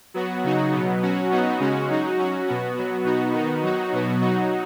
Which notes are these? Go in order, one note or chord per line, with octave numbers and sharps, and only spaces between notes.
F#3 B3 F#4
C#3 F#3 D#4 F#4
B2 F#3 B3
F#3 C#4 F#4
F#3 B3 D#4 F#4
C#3 G#3 C#4 F#4
F#3 D#4 F#4
F#3 C#4 F#4
B2 B3 F#4
F#3 B3 F#4
B2 B3 D#4 F#4
D#3 B3 D#4 F#4
F#3 D#4 F#4
B2 F#3 B3 F#4
F#3 D#4 F#4